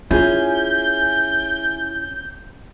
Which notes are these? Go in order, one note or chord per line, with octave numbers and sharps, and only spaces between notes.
C#4 E4 F4 G#4 G#5 G6